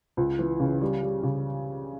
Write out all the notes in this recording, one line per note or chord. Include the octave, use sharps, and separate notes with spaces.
C#2
E3
C#3
G3
G3
C#3